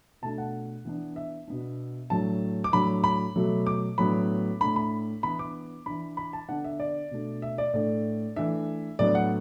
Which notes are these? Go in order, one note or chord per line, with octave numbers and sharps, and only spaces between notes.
B2 A3 D4 A5
F#5
E3 B3 D4
E5
B2 B3 D4
A2 F#3 D4 A5
D6
A2 F#3 D4 B5
B5
B2 F#3 A3
D6
A2 F#3 B3 D4 B5
A2 A3 D4 B5
B5
E3 B3 D4 B5
D6
E3 D4 B5
B5
A5
D3 B3 D4 F#5
E5
D5
B2 A3 D4
E5
D5
A2 A3 D4 D5
E3 A3 D4 E5
A2 F#3 B3 D4 D5
F#5